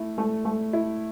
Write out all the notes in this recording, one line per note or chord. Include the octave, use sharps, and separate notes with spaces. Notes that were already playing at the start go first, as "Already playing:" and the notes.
Already playing: A3 E4
A3
A3
E4